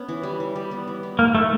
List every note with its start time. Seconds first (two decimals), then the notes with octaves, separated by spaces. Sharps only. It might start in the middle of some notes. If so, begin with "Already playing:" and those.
Already playing: B3 C#4
0.08 E3
0.23 G3
0.40 E3
0.55 G3
0.71 B3
0.87 E3
1.03 B3
1.19 A#3 D#4
1.34 A3 D#4